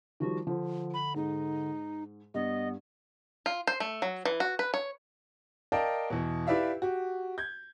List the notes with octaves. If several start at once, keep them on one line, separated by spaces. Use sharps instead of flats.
D#3 F3 G3 F#4
D3 F3
B5
G#2 D#4
G2 B3 D#5
F4
C5
A3
F#3
E3
F#4
B4
C#5
A#4 D5 D#5 F5 G5 A5
E2 B2
E4 G4 B4 D5 E5 F5
F#4 G4
G6 G#6